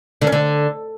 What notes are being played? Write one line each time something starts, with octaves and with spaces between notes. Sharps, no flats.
D3
C#4
D3